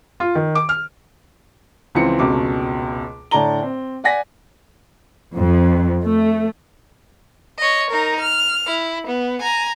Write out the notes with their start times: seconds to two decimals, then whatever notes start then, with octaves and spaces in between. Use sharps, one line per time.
0.20 F4
0.35 D#3
0.55 D6
0.69 F6
1.95 C#2 E3 F3 C4 C#7
2.19 F1 C#2 B2 D6
3.31 A2 D3 D5 A5 A#5 G7
3.63 C4
4.04 D5 F#5 G#5 A#6 B6
5.35 F2
6.05 A3
7.58 C#5 D#5
7.90 D#4 A#4
8.20 F6
8.67 E4
9.07 B3
9.39 G#5 A#5